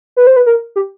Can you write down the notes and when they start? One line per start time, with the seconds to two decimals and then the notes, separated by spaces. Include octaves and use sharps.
0.17 B4
0.27 C5
0.36 B4
0.46 A#4
0.76 G4